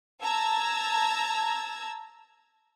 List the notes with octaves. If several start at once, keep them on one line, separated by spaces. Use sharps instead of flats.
A5 A#5 E6 G#6